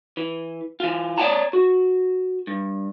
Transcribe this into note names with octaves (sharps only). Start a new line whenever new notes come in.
E3
E3 F4
C#5 D5 E5 F#5 A5 A#5
F#4
G2